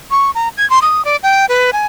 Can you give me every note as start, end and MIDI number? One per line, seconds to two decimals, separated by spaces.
0.11 0.31 85
0.35 0.48 82
0.57 0.68 92
0.70 0.79 84
0.82 1.05 87
1.05 1.16 74
1.23 1.46 79
1.49 1.71 71
1.73 1.86 80